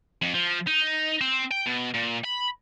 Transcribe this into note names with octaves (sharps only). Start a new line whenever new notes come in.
F2
F3
D#4
C4
G5
B2
A#2
B5